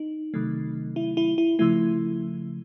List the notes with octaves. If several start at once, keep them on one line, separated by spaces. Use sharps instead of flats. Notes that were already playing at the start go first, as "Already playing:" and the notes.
Already playing: D#4
C3 D#3 F#3 A3
E4
E4
E4
C#3 F3 A3 E4